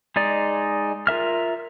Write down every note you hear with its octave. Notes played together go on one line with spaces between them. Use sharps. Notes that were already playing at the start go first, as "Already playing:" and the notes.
G#3 D#4 D5
F4 A#4 E5 F6